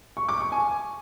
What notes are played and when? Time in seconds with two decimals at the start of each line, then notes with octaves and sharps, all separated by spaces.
0.17 C#6
0.28 D6
0.40 C#6
0.52 G#5